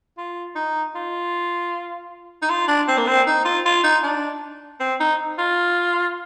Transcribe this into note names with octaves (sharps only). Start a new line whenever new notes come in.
F4
D#4
F4
D#4
F4
D4
C4
A#3
C4
D#4
F4
F4
D#4
D4
C4
D#4
F4